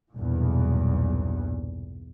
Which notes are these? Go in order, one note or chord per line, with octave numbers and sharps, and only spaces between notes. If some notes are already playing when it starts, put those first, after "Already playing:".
B1 E2 G2 A#2